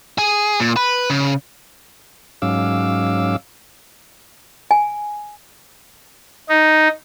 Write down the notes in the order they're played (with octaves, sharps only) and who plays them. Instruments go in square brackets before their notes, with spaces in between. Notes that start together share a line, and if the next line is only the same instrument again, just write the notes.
[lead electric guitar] G#4
A#2
B4
C#3
[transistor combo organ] G#2 F#3 C#4 F5 D6 E6
[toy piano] G#5
[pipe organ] D#4